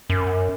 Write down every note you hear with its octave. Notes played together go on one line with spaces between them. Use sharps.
F#2